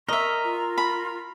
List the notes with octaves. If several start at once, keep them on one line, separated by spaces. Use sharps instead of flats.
A#4 D#5 E5 C#6
F4
B5